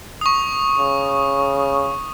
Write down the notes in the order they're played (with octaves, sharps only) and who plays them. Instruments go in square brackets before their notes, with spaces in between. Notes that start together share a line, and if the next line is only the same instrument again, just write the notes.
[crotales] C#6 D#6
[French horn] C#3